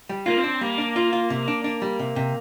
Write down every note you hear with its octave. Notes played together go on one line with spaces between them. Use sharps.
G3
A#3 F4
C4
D4
G3 A#3
D4
F4
F4
C3
D4
D4
G3
C3
C3